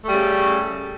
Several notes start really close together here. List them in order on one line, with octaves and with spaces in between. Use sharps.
A3 G3 C#3